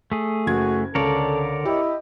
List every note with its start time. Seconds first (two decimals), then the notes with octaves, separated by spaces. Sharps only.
0.12 A3 G#4
0.46 F#1 F#4 G#6
0.95 C#2 D3 A4 A#4 C#5 D5
1.65 E4 G4 D#5